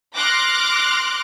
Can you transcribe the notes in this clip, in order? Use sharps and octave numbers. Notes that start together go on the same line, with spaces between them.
C6 D6 F6 F#6 A#6